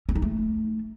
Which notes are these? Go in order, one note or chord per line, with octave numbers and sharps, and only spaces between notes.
C#4
D#4
A3